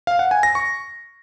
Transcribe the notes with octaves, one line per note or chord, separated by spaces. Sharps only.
F5
F#5
G#5
A#6
C#6